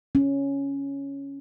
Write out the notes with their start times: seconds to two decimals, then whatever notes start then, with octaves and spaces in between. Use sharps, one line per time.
0.15 C#4